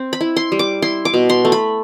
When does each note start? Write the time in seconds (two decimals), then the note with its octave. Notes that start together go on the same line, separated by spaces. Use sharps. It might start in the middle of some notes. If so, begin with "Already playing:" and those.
Already playing: C4
0.13 B5
0.21 E4
0.36 C6
0.52 G3
0.59 D6
0.82 E4 C6
1.05 D6
1.14 B2
1.30 C6
1.45 A3
1.52 B5